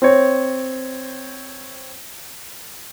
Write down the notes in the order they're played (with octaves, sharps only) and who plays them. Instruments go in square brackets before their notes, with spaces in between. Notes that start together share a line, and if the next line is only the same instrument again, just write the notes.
[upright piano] C4 C#5